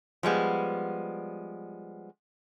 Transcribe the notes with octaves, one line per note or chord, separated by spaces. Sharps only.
F3 G3 G#3 B3